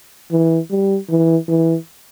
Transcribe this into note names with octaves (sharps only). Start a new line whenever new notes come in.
E3
G3
E3
E3